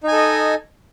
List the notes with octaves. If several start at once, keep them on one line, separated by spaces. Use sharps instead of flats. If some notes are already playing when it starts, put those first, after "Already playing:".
D#4 A4 D#5 G#5